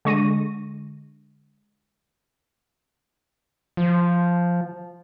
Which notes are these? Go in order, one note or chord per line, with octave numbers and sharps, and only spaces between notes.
D3 G#3 C#6 A#6 D#7
F3